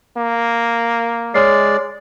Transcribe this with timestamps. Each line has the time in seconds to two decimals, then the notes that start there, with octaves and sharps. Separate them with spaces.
0.17 A#3
1.34 G#3 C#5 D5 F6 C7